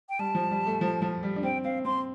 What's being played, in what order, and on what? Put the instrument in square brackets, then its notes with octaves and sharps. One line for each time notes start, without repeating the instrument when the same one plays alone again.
[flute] G5
[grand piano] G3 [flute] A5
[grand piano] F3
G3
A3
F3
F3
G3
D4
[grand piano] C4 [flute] G5
[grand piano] C4 [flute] F5
[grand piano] C4 [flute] C6